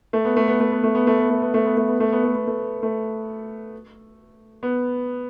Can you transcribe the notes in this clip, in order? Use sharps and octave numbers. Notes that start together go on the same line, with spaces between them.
A3
B3
A3
B3
A3
B3
A3
B3
A3
B3
A3
B3
A3
B3
A3
B3
A3
B3
A3
B3
A3
A3
B3